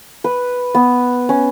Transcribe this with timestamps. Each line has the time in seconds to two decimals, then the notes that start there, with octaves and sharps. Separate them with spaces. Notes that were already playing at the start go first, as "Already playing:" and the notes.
0.24 B4
0.75 B3
1.29 C#4